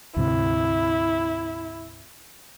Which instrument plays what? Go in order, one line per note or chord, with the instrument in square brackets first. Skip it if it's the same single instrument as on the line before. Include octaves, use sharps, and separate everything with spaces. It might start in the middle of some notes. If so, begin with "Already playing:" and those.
[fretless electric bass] D2 G#2 C3 [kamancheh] E4